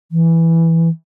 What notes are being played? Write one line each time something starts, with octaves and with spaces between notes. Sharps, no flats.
E3